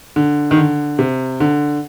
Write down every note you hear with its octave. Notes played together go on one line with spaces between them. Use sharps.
D3
D#3
D3
C3
D3